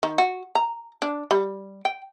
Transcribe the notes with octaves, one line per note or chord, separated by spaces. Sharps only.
D#3
F#4
A#5
D4
G3
G5